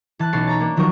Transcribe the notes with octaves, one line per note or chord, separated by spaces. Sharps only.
E3 A5 F#6
B1 C#4 A6 C7 C#7
C#5 A#5 A6
A#3 D4
D#3 F3 F#3 A#4 C#6 G6